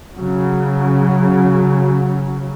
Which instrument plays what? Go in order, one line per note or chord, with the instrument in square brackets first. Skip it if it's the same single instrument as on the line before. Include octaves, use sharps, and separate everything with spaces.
[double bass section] C#3 F#3